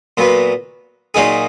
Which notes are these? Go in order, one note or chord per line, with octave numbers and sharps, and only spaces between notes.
A#2 F#3 B3
A#2 F#3 A#3 D#4 G#4